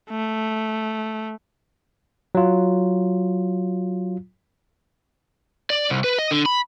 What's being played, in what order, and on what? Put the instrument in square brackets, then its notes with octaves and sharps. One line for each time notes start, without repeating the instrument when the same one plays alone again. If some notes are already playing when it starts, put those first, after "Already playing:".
[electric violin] A3
[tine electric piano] F#3 F4
[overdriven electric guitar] D5
C2
B4
D#5
D3
B5